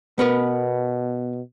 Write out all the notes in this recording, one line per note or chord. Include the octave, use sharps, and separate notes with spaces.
B2 B3 A#4 B4